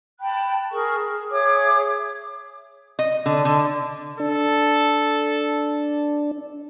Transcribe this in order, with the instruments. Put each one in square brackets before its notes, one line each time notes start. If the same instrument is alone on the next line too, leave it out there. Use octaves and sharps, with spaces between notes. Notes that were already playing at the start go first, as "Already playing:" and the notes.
[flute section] G5 A5 B5 F#6
G#4 A#4 C#6
G#4
G#4 C#5 E5 D6
[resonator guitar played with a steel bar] D#5
D3
D3
[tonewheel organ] D4 [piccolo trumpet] A4